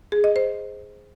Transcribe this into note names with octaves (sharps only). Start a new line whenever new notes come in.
G#4
D#5
C5